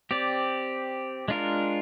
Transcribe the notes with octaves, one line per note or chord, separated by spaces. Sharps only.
C4 G4 D5
G#3 D4 F4 A#4